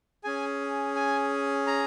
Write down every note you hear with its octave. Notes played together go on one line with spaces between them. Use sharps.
C#4 G#4 G#5
G#5
A#5